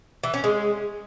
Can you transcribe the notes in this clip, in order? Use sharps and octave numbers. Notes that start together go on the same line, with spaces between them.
E3
C#4
G#3